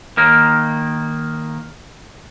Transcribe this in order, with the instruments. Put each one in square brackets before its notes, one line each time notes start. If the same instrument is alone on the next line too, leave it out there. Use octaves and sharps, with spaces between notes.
[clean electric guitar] D#3 A#3